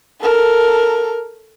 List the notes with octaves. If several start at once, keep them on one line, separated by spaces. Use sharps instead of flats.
A4 A#4